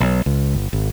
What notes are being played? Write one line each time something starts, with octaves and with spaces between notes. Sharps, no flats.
B1
C#2
G1
G#1